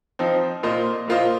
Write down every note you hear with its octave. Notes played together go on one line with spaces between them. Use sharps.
F3 C4 D#4
A#2 A#3 F4 C5 D#5
A#2 A#3 F4 C5 D#5